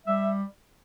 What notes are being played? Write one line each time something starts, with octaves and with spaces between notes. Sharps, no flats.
G3 E5